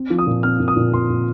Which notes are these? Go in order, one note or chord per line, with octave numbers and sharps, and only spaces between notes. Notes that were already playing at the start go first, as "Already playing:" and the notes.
Already playing: C4
F3
D#6
A#2
C4 F6
A#2
D#6
A#2
A#2 C6
A#2